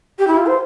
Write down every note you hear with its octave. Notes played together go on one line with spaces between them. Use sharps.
G4
E4
F4
C5